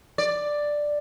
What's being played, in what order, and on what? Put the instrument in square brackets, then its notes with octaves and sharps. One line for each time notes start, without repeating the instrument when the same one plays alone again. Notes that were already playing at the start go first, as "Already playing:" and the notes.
[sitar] D5